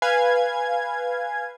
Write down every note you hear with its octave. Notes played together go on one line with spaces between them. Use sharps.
B4 F5 G#5 G#6